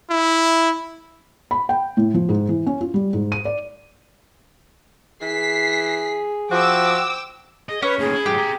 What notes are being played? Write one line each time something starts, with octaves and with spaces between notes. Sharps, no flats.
E4
B5
G5
A2
F3
G#2
E3
C#4
F4
G3
G#2
D#7
D5
E3 G#4 B6 C7
F3 F#4 G5 D6 E6
G#4 D#5
C#4 B4 C#5
D#2 A2 G#4
E4
G#2 F#3 G4
C4 A#5